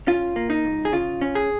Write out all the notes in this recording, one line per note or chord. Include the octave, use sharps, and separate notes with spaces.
C#4 F4
A#3
D#4
C#2
G#4
C#3 F4
C#4
G#4